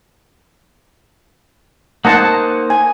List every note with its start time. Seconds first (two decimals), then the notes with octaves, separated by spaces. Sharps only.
2.05 A#3 D#4 C5 F#5 A5
2.70 G#5